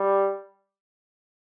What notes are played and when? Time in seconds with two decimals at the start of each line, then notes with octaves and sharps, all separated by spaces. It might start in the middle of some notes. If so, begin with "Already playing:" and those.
Already playing: G3